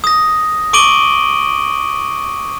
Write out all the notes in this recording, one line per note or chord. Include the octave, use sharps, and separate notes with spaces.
D#6 A#6
C#6 D6 D7 D#7 F#7 G7